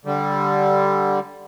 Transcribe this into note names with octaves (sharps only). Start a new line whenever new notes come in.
D3 G3